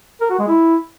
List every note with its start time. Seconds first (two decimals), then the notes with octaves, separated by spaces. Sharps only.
0.21 A#4
0.30 F#4
0.39 G#3
0.48 E4